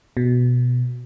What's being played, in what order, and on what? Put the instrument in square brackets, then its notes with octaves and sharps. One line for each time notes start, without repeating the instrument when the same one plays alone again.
[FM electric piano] B2